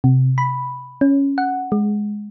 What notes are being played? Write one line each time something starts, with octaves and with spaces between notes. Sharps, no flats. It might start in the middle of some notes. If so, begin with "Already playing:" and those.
C3
B5
C#4
F#5
G#3